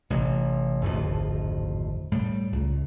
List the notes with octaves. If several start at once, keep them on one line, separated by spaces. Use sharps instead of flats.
A1 C3
D1 G#1 F2 F3
A2 G3
C#2